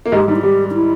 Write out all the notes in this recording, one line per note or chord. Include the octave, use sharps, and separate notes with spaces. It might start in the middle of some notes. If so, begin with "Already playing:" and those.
A#3
G#2 G#3 G4
G3 D#4
E4
G3 G4
D#4
E4